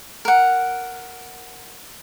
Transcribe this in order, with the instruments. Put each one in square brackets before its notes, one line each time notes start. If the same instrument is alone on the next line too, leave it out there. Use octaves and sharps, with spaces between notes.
[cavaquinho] A#4 F#5